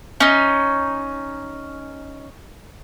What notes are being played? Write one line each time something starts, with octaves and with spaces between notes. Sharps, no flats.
C#4 D#4